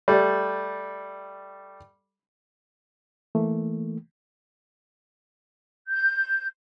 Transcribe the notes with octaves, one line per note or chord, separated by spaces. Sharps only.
G3 A3
E3 A3 A#3
G6